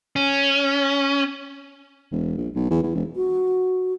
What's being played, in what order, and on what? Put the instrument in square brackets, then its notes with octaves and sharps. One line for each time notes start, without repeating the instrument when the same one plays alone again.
[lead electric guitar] C#4
[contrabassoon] E1
A#1
B1
E2
E2
E1
[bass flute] F#4